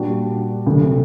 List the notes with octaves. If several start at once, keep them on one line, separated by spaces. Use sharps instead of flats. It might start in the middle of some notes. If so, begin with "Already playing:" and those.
Already playing: A#2 G3 D4 F#4
D2 C3 F#3 A3